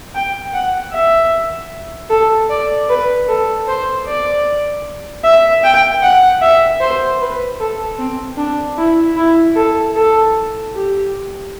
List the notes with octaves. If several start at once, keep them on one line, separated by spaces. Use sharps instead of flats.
G5
F#5
E5
A4
D5
B4
A4
C5
D5
E5
G5
F#5
E5
C5
B4
A4
C4
D4
E4
E4
A4
A4
G4